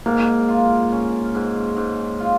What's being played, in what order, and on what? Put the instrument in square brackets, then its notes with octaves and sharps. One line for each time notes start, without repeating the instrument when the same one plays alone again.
[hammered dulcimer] G#2 [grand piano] A#3
[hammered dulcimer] F4
C#4
G#2
G#2
F4